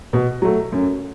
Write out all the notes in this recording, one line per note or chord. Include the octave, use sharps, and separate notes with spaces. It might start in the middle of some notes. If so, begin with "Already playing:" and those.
B2
F#3 A3
F#2